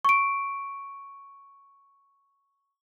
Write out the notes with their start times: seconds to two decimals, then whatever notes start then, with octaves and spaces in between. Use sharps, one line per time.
0.05 C#6 D7